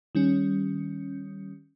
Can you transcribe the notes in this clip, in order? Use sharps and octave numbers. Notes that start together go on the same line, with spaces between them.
D#3 G3 C#4